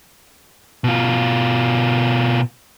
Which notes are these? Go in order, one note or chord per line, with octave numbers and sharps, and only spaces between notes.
B2 F4